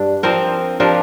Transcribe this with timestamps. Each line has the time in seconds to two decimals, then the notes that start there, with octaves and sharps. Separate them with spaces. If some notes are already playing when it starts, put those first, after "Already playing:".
Already playing: G2 D4
0.23 F3 C4 A#4
0.80 F3 D4 G4 A#4